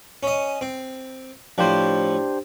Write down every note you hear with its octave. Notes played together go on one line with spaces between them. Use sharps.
C#4 D#5
C4
A2 F3 D4 G4 C5